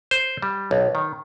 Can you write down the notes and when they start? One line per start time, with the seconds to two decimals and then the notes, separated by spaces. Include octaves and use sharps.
0.11 C5
0.42 G3
0.71 B1
0.95 D#3